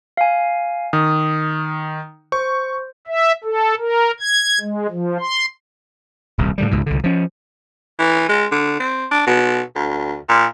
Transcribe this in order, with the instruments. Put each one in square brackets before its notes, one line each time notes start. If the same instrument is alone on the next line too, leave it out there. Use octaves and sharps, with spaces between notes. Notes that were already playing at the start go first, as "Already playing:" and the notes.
[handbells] F5 G#5
[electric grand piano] D#3 [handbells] D#6
[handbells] C5 [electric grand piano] C#6
[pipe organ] E5
A4
A#4
G#6
G#3
F3
C6
[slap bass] D#1 C2
A2 D3 G3
C#2 G#2 B2
C2 D3
F3 C#4
[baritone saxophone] E3
G#3
D3
C4
D4
B2
D2
A#2